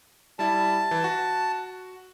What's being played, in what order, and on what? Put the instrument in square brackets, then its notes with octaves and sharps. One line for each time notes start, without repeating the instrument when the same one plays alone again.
[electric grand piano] G3 E4 [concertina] A5
[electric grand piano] E3
F#4